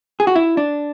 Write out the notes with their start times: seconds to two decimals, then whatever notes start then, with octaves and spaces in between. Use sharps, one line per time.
0.20 G#4
0.27 F#4
0.36 E4
0.57 D4